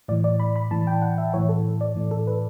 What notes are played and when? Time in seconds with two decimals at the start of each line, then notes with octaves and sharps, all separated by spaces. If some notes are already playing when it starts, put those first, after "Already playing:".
0.08 A2 E3 D5
0.24 D5
0.40 B5
0.56 B5
0.71 A2 E3 A5
0.87 G5
1.02 F#5
1.18 E5
1.34 A2 E3 C#5
1.49 A4
1.81 D5
1.95 A2 E3
2.11 A4
2.27 B4